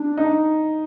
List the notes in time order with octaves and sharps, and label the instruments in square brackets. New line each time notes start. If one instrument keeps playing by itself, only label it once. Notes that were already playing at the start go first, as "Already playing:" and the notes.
Already playing: [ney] D4
[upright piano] D#4